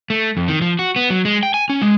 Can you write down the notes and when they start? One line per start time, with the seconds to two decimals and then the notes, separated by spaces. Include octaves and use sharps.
0.10 A3
0.37 F2
0.48 D#3
0.62 F3
0.79 F#4
0.96 B3
1.10 F#3
1.25 G#3
1.43 G5
1.54 G#5
1.70 C#4
1.82 G#3